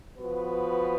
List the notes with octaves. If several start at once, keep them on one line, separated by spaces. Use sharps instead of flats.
F3 B3 F#4 B4